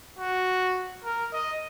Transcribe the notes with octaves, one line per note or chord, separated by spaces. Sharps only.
F#4
A#4
D#5